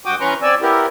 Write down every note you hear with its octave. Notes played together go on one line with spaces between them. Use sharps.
G2 F#4 G5 D6 D#6
E3 C#4 B4 A#5 C6 C#6
C4 D5 G#5 E6
B3 E4 G4 A#4